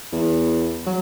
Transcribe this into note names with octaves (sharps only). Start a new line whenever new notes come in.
E2
F#3